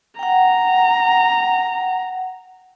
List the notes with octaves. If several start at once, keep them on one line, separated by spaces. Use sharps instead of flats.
F#5 G5 A#5